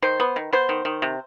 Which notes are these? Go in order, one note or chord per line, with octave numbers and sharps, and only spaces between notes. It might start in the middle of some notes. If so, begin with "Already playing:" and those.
D#3 C5
B3
D#3
B3 C5
D#3
D#3
C3